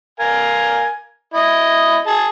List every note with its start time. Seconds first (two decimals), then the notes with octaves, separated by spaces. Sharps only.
0.20 A#4 F5 G#5
1.34 E4 D#5
2.06 G#4 A5